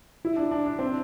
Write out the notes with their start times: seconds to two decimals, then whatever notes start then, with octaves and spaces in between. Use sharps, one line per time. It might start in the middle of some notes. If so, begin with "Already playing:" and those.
0.25 E4
0.36 D4
0.51 D4
0.66 D4
0.79 C4